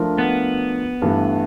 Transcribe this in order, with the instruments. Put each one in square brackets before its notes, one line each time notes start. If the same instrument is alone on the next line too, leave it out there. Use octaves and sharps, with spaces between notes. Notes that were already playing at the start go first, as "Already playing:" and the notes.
Already playing: [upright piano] F3 A3 D4 F4 A#4
[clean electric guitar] B3
[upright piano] G2 E3 A3